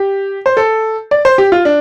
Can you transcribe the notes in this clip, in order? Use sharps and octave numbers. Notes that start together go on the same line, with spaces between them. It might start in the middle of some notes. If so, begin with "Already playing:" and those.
Already playing: G4
C5
A4
D5
C5
G4
F4
D4